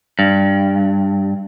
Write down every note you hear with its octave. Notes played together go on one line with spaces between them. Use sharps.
G2